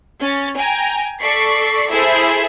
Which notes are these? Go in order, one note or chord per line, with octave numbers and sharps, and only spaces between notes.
C#4 A6
G5 G#5 A#5
A4 D5 C#6 B6 C7
E4 G#4 A4 C5 E5